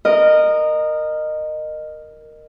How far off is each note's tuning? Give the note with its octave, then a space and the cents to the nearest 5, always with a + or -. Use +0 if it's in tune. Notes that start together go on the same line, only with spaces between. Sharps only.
A#4 +0 D#5 -20